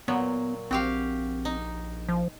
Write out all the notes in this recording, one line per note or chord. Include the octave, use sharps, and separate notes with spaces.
A#2 F#3 B3
A#1 C4 F#4 G4 F5
D#4
F3